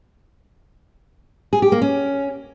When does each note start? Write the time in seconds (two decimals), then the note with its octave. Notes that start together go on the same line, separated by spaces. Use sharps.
1.53 G#4
1.62 G4
1.72 A#3
1.82 C#4